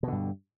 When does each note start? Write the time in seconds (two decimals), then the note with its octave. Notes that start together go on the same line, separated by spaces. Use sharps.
0.03 B2
0.08 D3
0.12 G2